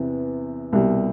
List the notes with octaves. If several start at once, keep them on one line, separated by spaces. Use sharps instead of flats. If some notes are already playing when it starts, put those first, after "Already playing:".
Already playing: E2 C3 E3 B3
C2 B2 G3